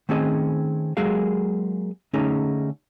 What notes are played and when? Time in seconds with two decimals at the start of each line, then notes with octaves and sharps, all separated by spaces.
0.09 D#3 A3 C4 C#4 G#4 D#5
0.97 F#3 G#3 A#3 G#4 F5
2.13 D3 A3 C#4 D#4 G#4